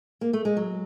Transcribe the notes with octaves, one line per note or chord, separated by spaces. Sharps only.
A#3
A3
G#3
F#3